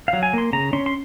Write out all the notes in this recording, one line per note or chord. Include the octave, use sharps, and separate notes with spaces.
F5
F#3
G#5
A#3 C6
C#3 A#5
C#4 C6
C6